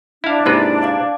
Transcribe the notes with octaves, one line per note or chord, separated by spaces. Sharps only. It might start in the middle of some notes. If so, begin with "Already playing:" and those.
D4 E4 F5
G#2 C3 A#3 E4 B4 A6
D5 F5 D6